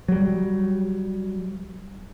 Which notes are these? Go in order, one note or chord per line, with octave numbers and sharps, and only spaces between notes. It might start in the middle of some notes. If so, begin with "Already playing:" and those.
F#3 G3